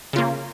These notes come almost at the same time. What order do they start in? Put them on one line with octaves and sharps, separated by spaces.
C#3 F4 A#3